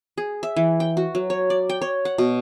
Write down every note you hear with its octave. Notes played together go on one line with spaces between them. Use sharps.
G#4
E5
E3
G5
F#4
F#3
C#5
D5
G5
C#5
F#5
B2